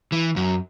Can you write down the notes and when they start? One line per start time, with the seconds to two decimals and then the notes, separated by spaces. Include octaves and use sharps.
0.12 E3
0.36 F#2